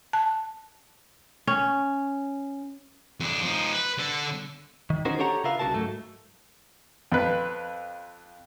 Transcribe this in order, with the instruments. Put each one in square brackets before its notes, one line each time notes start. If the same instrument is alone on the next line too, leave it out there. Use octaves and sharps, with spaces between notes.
[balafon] A5
[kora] C#4
[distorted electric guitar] F2 D4
F3 D#4
B4
D3 A4
[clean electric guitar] D#3
C#4 D#4 F#4 A#4 C5
D4 G4 A4 C#5 F#5 A#5
C#3 F4 A#4 B4 E5 F5
C2 C#3 F4 F#4 A#4 A5
G#2 F#3 A3
[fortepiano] F2 B4